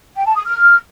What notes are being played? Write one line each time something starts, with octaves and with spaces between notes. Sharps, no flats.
G5
A5
D#6
F6